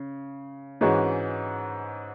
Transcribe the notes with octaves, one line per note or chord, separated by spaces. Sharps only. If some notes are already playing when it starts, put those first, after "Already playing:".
Already playing: C#3
G#2 E3 G#3 C#4 F#4